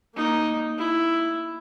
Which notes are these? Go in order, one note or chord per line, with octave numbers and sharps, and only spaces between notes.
A#3 D#4
E4